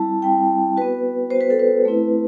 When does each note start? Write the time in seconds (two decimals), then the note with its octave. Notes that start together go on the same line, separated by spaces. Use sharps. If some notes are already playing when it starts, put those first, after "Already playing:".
Already playing: G3 C4 E4 A5
0.22 G3 C4 E4 G5
0.77 B3 F#4 B4
1.30 B3 F#4 C5
1.41 B4
1.50 A4
1.59 B4
1.85 A3 C4 E4